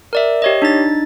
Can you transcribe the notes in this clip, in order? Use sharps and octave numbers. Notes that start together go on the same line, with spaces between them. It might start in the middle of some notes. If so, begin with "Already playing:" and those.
A#4 D5 E5
G4 C#5 D#5
D4 D#4 A6